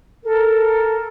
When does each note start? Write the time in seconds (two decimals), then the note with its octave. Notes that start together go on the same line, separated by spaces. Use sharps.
0.24 A4 A#4